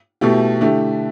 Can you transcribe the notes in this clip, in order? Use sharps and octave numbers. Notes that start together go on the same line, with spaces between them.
B2 A3 E4 G4
D3 A3 E4 G4